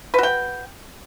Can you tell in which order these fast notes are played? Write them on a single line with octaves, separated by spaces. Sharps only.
B4 F#4 G5